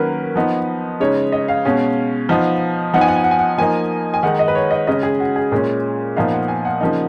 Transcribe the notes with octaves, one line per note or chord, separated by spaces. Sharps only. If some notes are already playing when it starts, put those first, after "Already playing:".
Already playing: D#3 F#3 A#3 C#4 A#4 B4
F3 B3 D#4
C#3 G#3 D#4 C#5
D#5
F5
B2 G#3 C#4
F3 B3 D#4
F3 B3 D#4 F#5
G#5
F#5
G#5
F#5
G#5
F#5
F3 A#3 D#4 G#5
G#5
D#3 G#3 D#4 F#5
D#5
B4
C#5
D#5
C#3 G#3 C#4 D#5
G#4
F#4
G#4
A#2 G#3 C#4
A#2 F3 B3 D#4 F5
F#5
G#5
F#5
C#3 F3 A#3 D#4